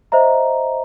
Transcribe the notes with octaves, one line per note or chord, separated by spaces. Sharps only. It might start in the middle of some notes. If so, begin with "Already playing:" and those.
C5 D#5 E5 A#5